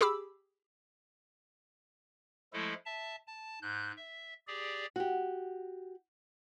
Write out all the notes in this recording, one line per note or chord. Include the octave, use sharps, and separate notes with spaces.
G4 G#4 B5 D6 E6
F3 G#3 A3 E4 A4
E5 A5
A5
G#2 F#6 G6
E5
G4 G#4 D5
F#4 G4